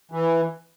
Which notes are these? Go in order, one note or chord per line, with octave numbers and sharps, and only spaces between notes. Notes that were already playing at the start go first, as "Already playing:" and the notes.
E3